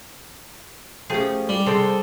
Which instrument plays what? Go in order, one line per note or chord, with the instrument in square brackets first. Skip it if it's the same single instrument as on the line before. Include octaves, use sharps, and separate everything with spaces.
[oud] F3 A3 G4 [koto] C#4 G#4
[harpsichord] G3
[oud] C3 C5 [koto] G#3 C4 [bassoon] A4